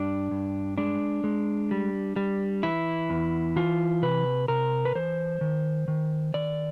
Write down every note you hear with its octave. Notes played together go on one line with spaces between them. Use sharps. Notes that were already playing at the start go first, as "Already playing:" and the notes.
Already playing: G2 D4
G2
G#3 D4
G#3
G3
G3
E3 E4
E2
E3 F4
C3 B4
C3 A#4
B4
E3 C5
D#3
D#3
D#3 D5